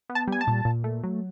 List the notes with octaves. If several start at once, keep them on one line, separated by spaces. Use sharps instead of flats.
B3
A5
G3 G#5
A5
A#2
A#2
A3
F#3